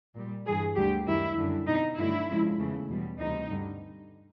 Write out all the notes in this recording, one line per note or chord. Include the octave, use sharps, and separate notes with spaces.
A#2 G3
G2 E3 G3 G#4
D2 D3 G3 G4
F#2 D#3 G3 E4
F#2 D3 G3
B2 G3 D#4
G2 D3 F#3 A3 E4
F2 C#3 F3 G#3
E2 C#3 E3 A3
E2 B2 G3
D2 C3 E3 G3 D#4
G2 D3 G3